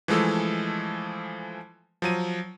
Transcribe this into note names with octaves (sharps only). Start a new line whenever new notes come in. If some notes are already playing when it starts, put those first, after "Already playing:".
E3 F3 G#3 A3 A4
F3 F#3 D#7